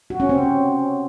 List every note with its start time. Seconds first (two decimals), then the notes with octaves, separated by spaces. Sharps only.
0.10 F#4
0.20 C#4
0.29 C4